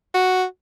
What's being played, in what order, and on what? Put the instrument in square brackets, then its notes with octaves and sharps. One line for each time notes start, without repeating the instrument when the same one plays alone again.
[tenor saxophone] F#4